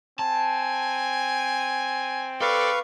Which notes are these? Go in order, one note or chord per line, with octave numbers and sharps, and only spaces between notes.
C4 G#5 A5
A4 B4 D5 F5 C#6